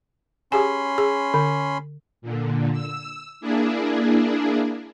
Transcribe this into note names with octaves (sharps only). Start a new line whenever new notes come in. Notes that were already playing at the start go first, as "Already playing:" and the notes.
C#4 G4 G#4 G#5 B5 C6
G#4
D3
A#2 D3
E6
A#3 D4 E4 G#4